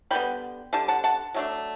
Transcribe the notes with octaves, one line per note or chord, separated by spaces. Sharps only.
D3 G3 B3 G5 B5
D3 G3 A5
F#5 A5
F#5 A5
F#3 A3 D4